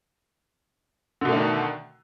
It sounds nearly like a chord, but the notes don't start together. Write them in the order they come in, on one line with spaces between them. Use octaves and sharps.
D3 B2 A3 D4 D#3